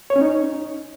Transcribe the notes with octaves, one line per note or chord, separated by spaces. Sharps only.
C#5
C#4
D#4